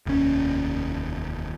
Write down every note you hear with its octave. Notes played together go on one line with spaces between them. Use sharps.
F1 D#2 A#2 C#4